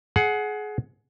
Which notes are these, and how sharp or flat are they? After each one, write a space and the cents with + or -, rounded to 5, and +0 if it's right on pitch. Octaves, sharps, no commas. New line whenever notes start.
G#4 +25 F#5 +0